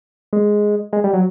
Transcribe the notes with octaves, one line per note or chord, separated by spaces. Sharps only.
G#3
G#3
G3
F#3